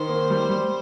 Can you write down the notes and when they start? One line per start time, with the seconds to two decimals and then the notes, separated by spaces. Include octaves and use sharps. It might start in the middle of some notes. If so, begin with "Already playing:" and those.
Already playing: D#3 C5
0.09 A#3
0.30 G3
0.50 G3